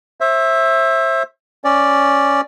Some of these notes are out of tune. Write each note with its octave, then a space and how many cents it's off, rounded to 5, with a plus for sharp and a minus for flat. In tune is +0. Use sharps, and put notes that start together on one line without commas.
C5 +35 E5 +0
C#4 +0 D5 +0